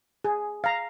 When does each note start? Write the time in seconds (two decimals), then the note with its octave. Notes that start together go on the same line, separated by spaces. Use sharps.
0.25 G#4
0.64 F5 A#5